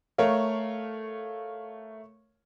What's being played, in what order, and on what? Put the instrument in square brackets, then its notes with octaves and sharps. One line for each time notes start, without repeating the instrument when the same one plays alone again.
[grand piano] A3 A#4 C#5 F5